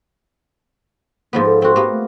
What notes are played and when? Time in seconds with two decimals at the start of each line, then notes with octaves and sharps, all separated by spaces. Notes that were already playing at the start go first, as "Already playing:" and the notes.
1.33 G#2 F3 A#3 B3
1.45 A4
1.62 C4 F#4 A4
1.76 A#3 B3 G4
1.90 A3